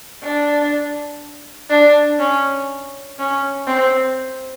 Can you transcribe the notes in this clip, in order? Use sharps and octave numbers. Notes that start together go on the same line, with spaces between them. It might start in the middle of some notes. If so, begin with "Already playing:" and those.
D4
D4
C#4
C#4
C4